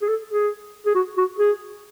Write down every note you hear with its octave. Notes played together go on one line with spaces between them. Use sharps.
G#4
A4
G#4
G#4
F#4
F#4
G#4